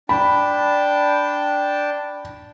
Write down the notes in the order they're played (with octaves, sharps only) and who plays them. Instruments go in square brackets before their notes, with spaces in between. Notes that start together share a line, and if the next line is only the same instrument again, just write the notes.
[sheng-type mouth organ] D4 G5 A5 [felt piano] B5